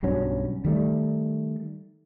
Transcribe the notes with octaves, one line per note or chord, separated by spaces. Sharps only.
B1 G2 F#3 C#4
D#3 G3 A3